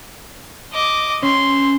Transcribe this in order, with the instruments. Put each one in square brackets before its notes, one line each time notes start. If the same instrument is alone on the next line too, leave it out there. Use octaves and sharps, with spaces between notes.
[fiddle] D#5 D6
[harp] C#4 [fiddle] C6